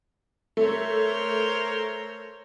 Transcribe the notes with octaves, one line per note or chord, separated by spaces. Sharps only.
A3 A#4 C5 C#5